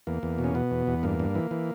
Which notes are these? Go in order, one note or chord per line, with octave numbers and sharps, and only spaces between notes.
E2 A#3
E2
B2
C#4
B2 B3
E2
E2
G2 A#3
G2
E3
E3